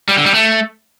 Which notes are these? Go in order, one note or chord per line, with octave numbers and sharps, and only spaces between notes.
G3
D3
G3
A3